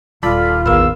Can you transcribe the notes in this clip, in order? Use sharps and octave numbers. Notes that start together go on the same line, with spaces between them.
D#1 F4 A4 D5 B5
A1 E2 D#3 A#3 B4 F5 E6